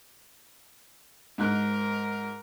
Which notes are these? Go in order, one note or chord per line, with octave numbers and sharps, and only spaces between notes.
G#2 A#4 F#6